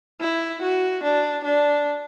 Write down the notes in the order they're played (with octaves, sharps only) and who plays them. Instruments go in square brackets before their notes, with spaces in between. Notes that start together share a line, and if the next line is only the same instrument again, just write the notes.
[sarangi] E4
F#4
D4
D4